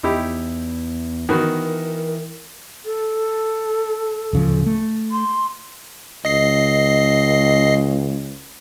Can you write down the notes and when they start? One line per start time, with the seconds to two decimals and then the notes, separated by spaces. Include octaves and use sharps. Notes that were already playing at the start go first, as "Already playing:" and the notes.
0.03 E2 D#4 E4 G4
1.29 D#3 E3 B3 F#4 A#4
2.85 A4
4.33 D1 C#3 F3
4.66 A3
5.11 C6
6.25 C#2 D#5 C7